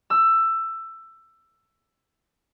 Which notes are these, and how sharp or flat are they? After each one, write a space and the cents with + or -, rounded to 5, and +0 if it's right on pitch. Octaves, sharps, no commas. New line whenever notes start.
E6 +15